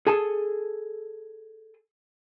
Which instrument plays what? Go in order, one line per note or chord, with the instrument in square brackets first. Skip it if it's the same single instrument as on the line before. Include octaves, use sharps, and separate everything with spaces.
[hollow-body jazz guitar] G#4 A4 G#5 A5